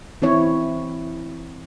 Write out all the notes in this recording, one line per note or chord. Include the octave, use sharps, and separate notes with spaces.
E3 C4 E4 C#5